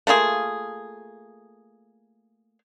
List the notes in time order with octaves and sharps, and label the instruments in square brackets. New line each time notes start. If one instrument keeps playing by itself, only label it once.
[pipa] A3 A#3 F4 G#4